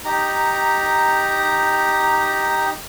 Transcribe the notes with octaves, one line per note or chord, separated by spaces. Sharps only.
D#4 G4 A#5